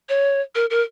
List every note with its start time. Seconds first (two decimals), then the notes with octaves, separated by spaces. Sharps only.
0.09 C#5
0.55 A#4
0.70 A#4